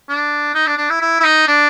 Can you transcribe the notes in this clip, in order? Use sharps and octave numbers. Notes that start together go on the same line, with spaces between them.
D4
D#4
D4
D4
E4
E4
E4
D#4
D4